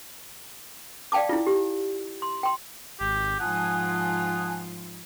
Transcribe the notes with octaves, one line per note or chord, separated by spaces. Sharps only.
D5 F5 G5 A5 D6
E4 F4
G4
C6
G5 C6
G#1 G4
G#2 F3 F4 F#5 G#5 A5 D#6